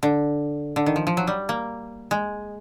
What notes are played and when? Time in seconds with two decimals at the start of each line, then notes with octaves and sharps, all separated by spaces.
0.03 D3
0.76 D3
0.86 D#3
0.96 F3
1.07 F3
1.17 F#3
1.27 G3
1.49 A#3
2.11 G#3